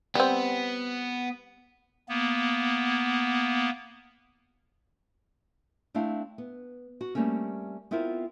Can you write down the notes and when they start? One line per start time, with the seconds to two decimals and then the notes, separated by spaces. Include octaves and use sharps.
0.15 G3 B3 C4
2.09 A#3 B3
5.94 A3 C4 D4 E4 F5
6.38 B3
7.01 F#4
7.15 G3 A3 A#3 C4 C#4
7.91 B3 C4 E4 F4 A#4 C5